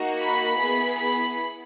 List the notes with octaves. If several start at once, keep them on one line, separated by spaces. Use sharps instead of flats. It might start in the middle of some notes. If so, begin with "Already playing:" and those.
Already playing: A#3 D#4 F#4
B5
B3 E4 G#4
B5